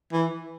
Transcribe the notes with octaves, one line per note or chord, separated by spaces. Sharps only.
E3